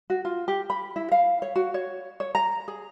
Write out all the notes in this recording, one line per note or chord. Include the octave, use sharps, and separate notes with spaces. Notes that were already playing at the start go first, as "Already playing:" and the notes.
F#4
F4
G4
B5
E4
F5
C#5
F#4
C#5
C#5
A#5
G#4